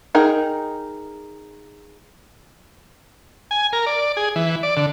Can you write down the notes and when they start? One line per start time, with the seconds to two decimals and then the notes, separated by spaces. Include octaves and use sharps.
0.15 D#4 G#4 A#4 G5
3.51 G#5
3.73 A#4
3.86 D5
4.17 G#4
4.36 E3
4.63 D5
4.77 D3